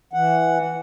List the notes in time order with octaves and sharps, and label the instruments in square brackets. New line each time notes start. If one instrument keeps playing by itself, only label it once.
[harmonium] E3 F#5